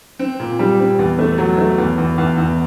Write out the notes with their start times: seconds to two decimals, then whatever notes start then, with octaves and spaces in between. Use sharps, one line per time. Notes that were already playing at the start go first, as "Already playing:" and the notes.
0.19 C4
0.40 A#2
0.59 G3
0.79 C4
0.99 E2
1.19 A3
1.38 F#3
1.58 A3
1.78 E2
1.98 E2
2.18 E2
2.37 E2